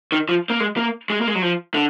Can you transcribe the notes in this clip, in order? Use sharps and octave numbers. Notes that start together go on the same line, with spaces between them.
D#3
F3
A#3
G#3
A#3
G#3
A#3
G#3
F#3
F3
D3